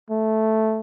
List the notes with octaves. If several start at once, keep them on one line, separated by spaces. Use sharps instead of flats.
A3